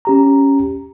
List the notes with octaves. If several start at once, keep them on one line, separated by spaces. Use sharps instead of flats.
C#4 G4 A#5